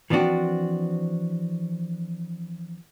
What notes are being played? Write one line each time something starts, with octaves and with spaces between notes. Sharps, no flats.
E3 F3 C4 D4 F#4